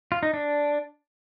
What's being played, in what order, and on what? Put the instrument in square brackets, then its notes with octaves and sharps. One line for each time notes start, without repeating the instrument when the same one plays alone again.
[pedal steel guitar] F4
D#4
D4